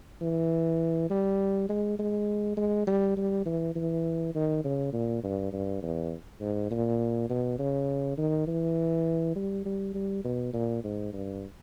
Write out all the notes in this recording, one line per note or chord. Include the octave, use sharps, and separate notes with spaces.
E3
G3
G#3
G#3
G#3
G3
G3
E3
E3
D#3
C#3
A#2
G2
G2
E2
G#2
A#2
B2
C#3
D#3
E3
G3
G3
G3
B2
A#2
G#2
G2